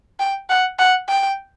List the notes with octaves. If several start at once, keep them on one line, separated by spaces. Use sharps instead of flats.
G5
F#5
F#5
G5